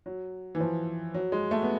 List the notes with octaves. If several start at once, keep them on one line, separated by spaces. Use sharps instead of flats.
F#3
E3
F3
F#3
G#3
A3
B3